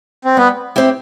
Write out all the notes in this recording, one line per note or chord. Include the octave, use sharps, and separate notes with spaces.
C4
G3 B3
C4 E4 G4